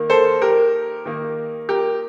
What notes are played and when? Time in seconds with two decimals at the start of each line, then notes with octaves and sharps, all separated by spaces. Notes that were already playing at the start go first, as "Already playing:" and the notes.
Already playing: D#3 A#3
0.10 A4 C5
0.42 G4 A#4
1.06 D#3 A#3
1.69 G4 A#4